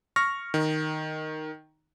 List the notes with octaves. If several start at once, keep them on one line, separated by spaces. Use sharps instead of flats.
C#6 F6 A#6
D#3